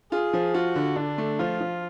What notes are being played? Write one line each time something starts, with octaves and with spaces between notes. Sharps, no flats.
F4 G#4
F3
F4 F#4
D3
D3 D4
A3
F3 F4
F3